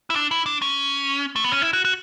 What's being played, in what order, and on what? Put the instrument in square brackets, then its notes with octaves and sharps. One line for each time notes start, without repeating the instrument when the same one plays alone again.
[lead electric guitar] E4
D4
E4
D4
C#4
A3
B3
C#4
E4
F#4
F#4